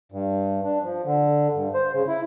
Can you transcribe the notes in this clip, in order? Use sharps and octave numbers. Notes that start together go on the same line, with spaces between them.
G2
D4
F3
D3
G2
C5
C#3
E4